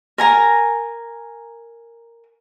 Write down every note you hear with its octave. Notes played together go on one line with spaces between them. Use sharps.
A#4 G#5 A#5